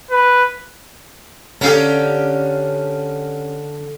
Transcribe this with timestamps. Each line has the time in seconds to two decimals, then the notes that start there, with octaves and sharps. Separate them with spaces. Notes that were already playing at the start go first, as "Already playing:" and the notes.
0.11 B4
1.61 D3 C#4 G4 A4 F5 A#5